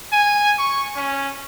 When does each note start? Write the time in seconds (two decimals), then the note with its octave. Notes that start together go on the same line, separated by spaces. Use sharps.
0.12 G#5
0.58 C#6
0.96 C#4